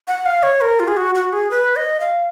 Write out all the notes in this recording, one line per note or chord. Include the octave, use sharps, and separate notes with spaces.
F#5
F5
C#5
A#4
F4
G#4
F#4
F#4
G#4
B4
D#5
F5